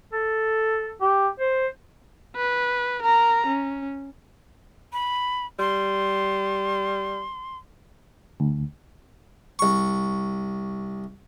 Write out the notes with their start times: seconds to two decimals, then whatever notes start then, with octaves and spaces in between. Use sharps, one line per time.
0.13 A4
1.01 G4
1.39 C5
2.36 B4
3.03 A#4 A#5
3.46 C#4
4.93 B5
5.59 G3 C6
8.40 D2
9.59 C2 C#6